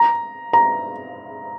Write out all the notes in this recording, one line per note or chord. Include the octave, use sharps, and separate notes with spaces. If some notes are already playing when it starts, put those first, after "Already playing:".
Already playing: A#5
A#5